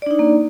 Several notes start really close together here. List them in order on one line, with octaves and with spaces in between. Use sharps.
D5 D4 D#4 C#5 A#3